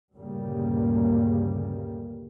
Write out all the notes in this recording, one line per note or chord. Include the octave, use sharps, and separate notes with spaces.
D2 G2 A#2 C#3 G3 A#3